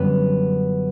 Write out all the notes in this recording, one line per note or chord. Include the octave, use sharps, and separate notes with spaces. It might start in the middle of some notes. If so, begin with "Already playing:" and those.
Already playing: F#2 D3 G3 B3